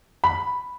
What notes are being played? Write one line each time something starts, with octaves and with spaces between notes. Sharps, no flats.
B5